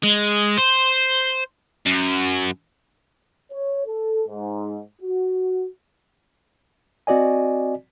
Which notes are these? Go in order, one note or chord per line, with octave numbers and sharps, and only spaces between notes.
G#3
C5
F#2
C#5
A4
G#2
F#4
C4 F#4 D5 D#5 G#5